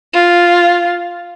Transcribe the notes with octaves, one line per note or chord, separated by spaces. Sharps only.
F4